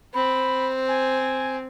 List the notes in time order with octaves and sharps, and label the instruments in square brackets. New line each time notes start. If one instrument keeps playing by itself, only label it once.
[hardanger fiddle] C4 [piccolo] B5
[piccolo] G#5